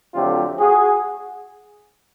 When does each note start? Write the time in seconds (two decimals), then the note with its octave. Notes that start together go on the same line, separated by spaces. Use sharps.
0.14 F2 D3 F#3 A3 C4 F4 G4
0.58 F#4 G#4